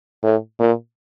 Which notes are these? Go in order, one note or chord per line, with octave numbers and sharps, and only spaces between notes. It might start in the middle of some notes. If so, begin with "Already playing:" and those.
A2
A#2